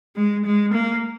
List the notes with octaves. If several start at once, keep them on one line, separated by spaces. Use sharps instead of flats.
G#3
G#3
A#3